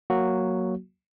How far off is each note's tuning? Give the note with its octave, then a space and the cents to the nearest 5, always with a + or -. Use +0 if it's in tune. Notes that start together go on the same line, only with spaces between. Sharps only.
F#3 +0 A#3 +5 F#4 +0